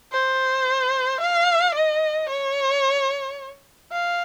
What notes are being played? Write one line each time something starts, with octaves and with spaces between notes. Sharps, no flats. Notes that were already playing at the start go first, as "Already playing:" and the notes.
C5
F5
D#5
C#5
F5